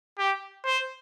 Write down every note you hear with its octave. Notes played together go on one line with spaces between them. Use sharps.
G4
C5